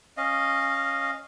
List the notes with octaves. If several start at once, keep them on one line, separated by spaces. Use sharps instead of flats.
C#4 D#5 F5